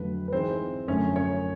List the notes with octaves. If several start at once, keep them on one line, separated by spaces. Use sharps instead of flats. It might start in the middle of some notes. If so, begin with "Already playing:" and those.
Already playing: F2 D3 F#3 A3 B4
B4
G#2 E3 G#3 C4 C5
F#2 D3 F3 A3 C#4 C#5
C#4 C#5